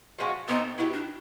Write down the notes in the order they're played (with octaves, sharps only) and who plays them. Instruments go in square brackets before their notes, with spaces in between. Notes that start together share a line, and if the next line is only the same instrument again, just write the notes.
[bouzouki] F3 G#3 C#4 F#4
[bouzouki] E3 A3 C4 D#4 [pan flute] B3
[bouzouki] F#3 B3 D4 G4 [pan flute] E4
[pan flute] D4